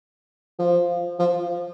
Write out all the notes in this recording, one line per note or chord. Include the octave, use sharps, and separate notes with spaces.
F3
F3